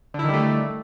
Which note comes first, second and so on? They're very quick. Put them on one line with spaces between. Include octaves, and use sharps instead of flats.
D3 E4 D#3 G3 A3